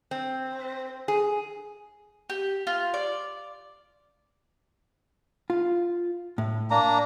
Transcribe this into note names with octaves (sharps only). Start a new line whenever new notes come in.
C4
G#4
G4
F4
D5
F4
A2
A#3 D4 A#5